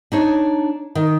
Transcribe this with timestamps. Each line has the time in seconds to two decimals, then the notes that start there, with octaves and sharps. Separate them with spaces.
0.12 D4 D#4 C#5
0.95 D#3